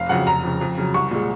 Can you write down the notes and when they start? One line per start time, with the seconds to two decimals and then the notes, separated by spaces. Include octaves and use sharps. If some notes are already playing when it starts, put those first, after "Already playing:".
Already playing: F1 F5
0.09 F2 C#3 F#3 F#5
0.26 F1 A#5
0.44 F2 C#3
0.61 F2
0.77 C#3 F#3
0.94 C2 C#6
1.11 A#2 G#3